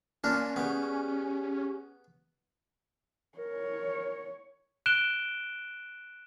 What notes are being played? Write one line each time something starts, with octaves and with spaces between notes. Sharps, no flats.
A#3 C#4 D4 F4
G3 B3 G#4
A#4 C#5
F#6 D7 E7 G7